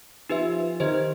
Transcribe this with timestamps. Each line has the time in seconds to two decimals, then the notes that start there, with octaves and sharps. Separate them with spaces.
0.29 F3 D#4 G4 B4 E5
0.80 D#3 G4 C5 D#5